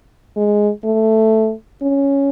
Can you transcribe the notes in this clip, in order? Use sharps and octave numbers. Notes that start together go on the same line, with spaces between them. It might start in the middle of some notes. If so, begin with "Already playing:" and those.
G#3
A3
C#4